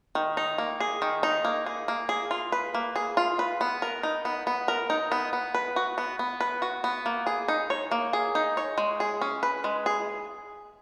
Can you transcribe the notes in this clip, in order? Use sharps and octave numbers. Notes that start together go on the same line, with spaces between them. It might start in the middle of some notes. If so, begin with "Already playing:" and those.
D#3
D#4
A#3
G#4
D#3
D#4
A#3
G#4
A#3
G#4
F4
B4
A#3
G#4
F4
B4
B3
A#4
D#4
B3
B3
A#4
D#4
B3
B3
B4
F#4
B3
B3
B4
F#4
B3
A#3
G#4
D#4
C#5
A#3
G#4
D#4
C#5
G#3
G#4
C#4
B4
G#3
G#4